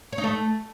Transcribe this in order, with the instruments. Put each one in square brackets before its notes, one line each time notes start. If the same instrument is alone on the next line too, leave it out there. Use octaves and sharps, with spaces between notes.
[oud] C#5
D#4
A3